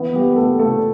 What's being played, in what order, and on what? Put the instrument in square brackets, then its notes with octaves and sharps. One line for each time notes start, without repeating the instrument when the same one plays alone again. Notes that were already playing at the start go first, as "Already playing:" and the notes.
Already playing: [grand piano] E3 E4 [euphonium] B3
[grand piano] G3 G4
A3 A4
A3 A4